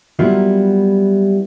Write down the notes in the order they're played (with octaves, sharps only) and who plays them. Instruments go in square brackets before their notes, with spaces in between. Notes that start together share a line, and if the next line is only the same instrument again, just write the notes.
[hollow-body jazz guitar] F#3 G3 A#3 B3 E4 F4